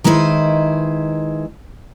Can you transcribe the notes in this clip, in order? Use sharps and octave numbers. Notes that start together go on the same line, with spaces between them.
D#3 G#3 E4 B4 C5